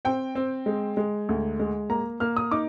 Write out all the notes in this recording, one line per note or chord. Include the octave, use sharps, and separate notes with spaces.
C4 G5
C4
G#3
G#3
D2
G#3
A#3 A#5
A#3 F6
D#6
D#4 D6